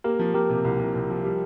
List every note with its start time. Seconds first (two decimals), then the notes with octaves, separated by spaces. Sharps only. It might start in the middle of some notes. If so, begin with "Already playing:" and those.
0.04 A#3 G4 A#4
0.19 F3
0.34 F3 G4 A#4
0.49 C3
0.64 C2
0.79 C2
0.95 C2
1.10 F3
1.24 G3